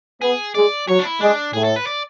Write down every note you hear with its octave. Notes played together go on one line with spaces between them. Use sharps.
B3 G#4
G#3 D5
F#3 C#5
D4
E4
G#3 D4
A2 G#4
A4
B4
D5